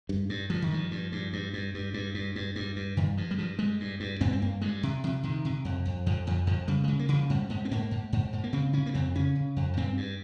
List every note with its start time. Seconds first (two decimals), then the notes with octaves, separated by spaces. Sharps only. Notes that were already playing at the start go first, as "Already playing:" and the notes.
0.09 G2
0.29 G2
0.50 G2 F3
0.62 D#3
0.71 G2 F3
0.91 G2
1.12 G2
1.33 G2
1.53 G2
1.74 G2
1.94 G2
2.14 G2
2.36 G2
2.56 G2
2.76 G2
2.97 G2 D#3
3.17 G2 F3
3.31 G3
3.38 G2 F3
3.59 G2 G#3
3.80 G2
4.00 G2
4.21 G2 C4
4.33 C4
4.42 G2 A#3
4.62 G2 G#3
4.83 C3
5.04 C3 F3
5.23 C3 D#3
5.45 C3
5.65 F2
5.85 F2
6.06 F2 F3
6.27 F2 F3
6.47 F2 F3
6.68 C#3 G3
6.84 G#3
6.88 C#3
6.99 A#3
7.09 C#3
7.14 F3
7.30 G#2 G3
7.50 G#2 G#3
7.65 C4
7.71 G#2 A#3
7.91 G#2
8.13 G#2
8.33 G#2
8.44 A#3
8.53 C#3 C4
8.73 C#3 C#4
8.86 A#3
8.94 F2 C4
9.15 C#3 C#4
9.36 C#3
9.56 F2
9.77 G2 C4
9.97 G2